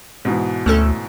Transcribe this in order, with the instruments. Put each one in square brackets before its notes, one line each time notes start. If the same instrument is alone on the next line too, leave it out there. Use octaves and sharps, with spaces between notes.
[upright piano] G#2 B2 E3
[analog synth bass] D2 [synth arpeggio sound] A3 C#4 A4